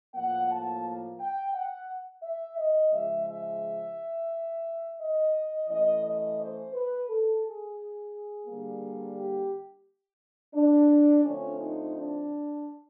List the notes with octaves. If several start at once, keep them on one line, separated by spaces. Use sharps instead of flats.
A2 F3 A#3 F#5
A5
G5
F#5
E5
D#5
C#3 F3 G#3 E5
E5
D#5
E3 A3 C#4 D#5
D#5
C5
B4
A4
G#4
D3 G3 A#3
G4
D4
D3 F3 A3 C4 C#4
D#4
D4